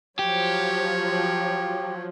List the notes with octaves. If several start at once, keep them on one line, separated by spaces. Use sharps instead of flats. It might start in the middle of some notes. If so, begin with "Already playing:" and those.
F3 F#3 G4 C#5